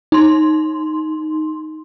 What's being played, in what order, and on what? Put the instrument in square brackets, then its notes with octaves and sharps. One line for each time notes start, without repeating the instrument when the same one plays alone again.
[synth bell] D#4 C6